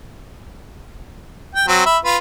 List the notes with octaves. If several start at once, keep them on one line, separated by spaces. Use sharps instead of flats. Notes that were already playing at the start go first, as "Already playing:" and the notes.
G5
F#3 C4
E5 B5
F4 B4